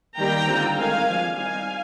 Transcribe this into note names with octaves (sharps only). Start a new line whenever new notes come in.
D#3 G3 A#3 G5 A#5
D3 G3 C4 F4
D#3 G#3 C4 F5 G#5
F3 G#3 D4
G3 C4 D#4 F5 G#5